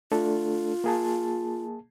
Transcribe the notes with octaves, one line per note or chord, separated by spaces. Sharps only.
A3 D4 F4 A4
A#3 G#4 A5